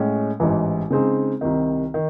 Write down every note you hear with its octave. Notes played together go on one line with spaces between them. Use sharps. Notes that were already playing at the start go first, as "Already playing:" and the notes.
Already playing: A2 G#3 C#4
A1 G#2 E3
C#3 G#3 C4 D#4 G#4
C2 C3 D#3
D#3